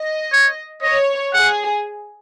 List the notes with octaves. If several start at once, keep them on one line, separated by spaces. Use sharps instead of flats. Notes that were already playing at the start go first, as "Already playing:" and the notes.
Already playing: D#5
C#5
C#5 D#5
G#4 F#5